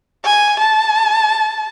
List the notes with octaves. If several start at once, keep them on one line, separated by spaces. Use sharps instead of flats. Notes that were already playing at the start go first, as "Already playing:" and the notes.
G#5
A5